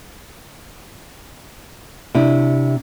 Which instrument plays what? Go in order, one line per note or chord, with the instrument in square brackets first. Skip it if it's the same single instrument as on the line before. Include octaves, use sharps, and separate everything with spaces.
[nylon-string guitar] C3 D4 E4